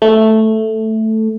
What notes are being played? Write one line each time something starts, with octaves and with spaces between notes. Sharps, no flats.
A3